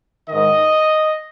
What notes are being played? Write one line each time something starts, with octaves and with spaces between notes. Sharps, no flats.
G#2 D#3 D#5